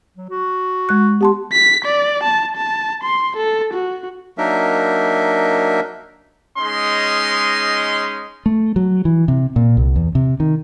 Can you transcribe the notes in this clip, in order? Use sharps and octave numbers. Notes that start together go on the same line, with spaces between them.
F#3
F#4
G#3 F#6
B3 G4 A5 C6
B6
D5
A5
A5
C6
A4
F#4
F#3 A#3 D4 D#4 A#4 E5
G#3 C#4 D#4 D#5 C6
A3
F#3
E3
C3
A#2
C2
E2
C3
D#3